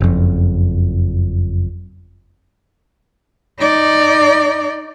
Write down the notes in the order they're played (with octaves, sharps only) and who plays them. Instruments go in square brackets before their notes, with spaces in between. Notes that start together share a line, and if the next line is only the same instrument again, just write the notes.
[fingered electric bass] F#1 F2
[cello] D#4 D5